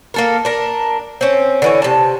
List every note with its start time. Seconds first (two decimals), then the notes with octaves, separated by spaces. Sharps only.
0.14 A#3 A4 A#4
0.45 D4 A#4
1.21 C4 C#4
1.62 D3 E3 C#5
1.82 C3 A5